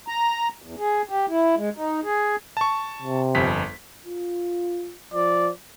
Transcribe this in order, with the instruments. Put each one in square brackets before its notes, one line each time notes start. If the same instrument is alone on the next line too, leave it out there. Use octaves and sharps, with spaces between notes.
[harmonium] A#5
E2
G#4
G4
E4
G#3
D#4
G#4
[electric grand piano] A5 C#6
[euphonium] C3
[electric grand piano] G1 F2 B6
[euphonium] F4
[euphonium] F3 [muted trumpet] D5